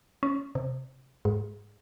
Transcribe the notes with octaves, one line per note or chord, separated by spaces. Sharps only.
C#4
C3
G#2